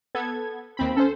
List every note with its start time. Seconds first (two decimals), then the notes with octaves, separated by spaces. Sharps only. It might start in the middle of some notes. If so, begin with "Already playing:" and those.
0.15 B3 A4 G#6
0.77 D#2 C4 B5
0.96 C#4 A4 C5